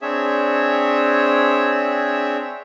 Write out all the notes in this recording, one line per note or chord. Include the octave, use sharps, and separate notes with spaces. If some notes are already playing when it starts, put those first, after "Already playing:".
C4 D4 G#4 C#5 E5